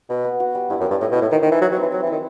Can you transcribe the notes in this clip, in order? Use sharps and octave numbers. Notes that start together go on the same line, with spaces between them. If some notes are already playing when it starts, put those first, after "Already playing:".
B2 B4
B3
F#4
G3
G2 E4
F#2
G2 G3
A2 D#5
B2
E4
A2
D#3 C5
D#3
E3 D#4
F#3 B4
F#3
C4
E3
F#3 E5
E3
D#3 E4